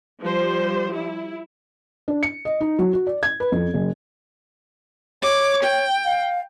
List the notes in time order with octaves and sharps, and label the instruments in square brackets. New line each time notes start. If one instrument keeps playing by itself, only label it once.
[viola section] F3 G3 C5
E4
[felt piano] D4
C#7
D#5
D#4
F#3
F#4
D5
G#6
B4
F2
F#1
[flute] C#5 [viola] D6
[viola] G5
[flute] F5